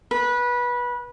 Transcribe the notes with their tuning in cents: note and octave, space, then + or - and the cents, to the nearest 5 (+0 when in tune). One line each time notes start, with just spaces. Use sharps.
B4 -20